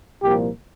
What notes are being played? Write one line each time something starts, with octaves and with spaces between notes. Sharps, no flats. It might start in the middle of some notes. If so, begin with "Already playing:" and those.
C2 A#2 F3 A#3 G4